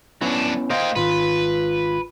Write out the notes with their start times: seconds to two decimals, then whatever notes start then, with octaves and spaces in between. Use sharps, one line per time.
0.22 F#3 B3 C#4 D4 E4
0.70 A#3 C5 D#5 F5 G5
0.96 G#1 F4 B4